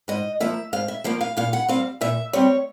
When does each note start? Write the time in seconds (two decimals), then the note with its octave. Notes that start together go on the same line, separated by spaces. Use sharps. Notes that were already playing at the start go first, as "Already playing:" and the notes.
0.08 G#2 D#5
0.40 F3 A#3 E5
0.73 G#2 F5
0.88 E5
1.04 F3 A#3 F5
1.21 F5
1.37 A#2 F5
1.53 F#5
1.69 G3 C4 F5
2.01 A#2 E5
2.33 G3 C4 C#5